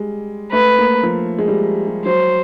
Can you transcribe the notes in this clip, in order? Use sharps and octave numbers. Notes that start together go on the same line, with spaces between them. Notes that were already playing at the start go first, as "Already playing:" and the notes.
Already playing: G3 G#3
A3 B4
A#3
F3
G#3
G3
G3
F#3 C5